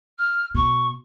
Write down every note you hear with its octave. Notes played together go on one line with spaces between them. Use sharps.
F6
B2 C#6